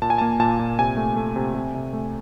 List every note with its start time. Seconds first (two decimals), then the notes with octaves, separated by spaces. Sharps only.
0.02 A#2 A5
0.10 G#5
0.18 A#3 A5
0.40 A#2 A5
0.59 A#2
0.79 C3 G#5
0.97 A3
1.16 A3
1.36 C3
1.55 C3
1.75 C3
1.93 A3